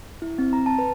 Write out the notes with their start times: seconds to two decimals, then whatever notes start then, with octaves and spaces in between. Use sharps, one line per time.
0.22 E4
0.38 C4
0.53 A#5
0.66 A5
0.79 B4